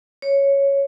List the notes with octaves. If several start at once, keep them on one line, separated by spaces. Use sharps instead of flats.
C#5